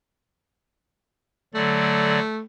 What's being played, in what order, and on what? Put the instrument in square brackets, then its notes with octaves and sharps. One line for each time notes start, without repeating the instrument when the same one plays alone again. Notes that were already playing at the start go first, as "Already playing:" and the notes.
[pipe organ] D3 F#3 D5 [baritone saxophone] A3